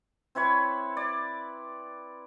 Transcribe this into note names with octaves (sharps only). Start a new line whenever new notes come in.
C4 E4 B4 C#5
D5